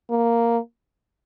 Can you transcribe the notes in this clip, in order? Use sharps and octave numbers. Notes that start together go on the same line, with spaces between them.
A#3